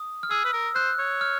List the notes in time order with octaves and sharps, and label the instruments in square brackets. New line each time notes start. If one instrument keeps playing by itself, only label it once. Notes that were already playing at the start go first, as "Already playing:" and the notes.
Already playing: [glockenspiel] D#6
F6
[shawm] G#4 [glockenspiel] E6
[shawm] B4
A#4
[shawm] C5 [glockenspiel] F#6
[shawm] C#5
[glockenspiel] F6